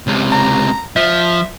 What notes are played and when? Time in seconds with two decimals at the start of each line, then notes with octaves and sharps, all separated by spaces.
0.07 C#2 C3
0.32 A#5
0.96 F3 E5